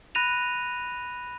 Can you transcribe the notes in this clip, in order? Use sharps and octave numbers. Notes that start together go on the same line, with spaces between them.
B5 F#6 A#6 D#7 F7